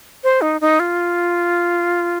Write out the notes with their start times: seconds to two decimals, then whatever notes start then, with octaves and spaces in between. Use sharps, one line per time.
0.24 C5
0.42 D#4
0.61 D#4
0.80 F4